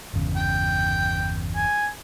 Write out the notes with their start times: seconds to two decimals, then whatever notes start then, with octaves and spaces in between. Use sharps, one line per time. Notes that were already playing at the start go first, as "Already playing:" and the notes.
0.14 G1 E2 C#3
0.36 G5
1.56 G#5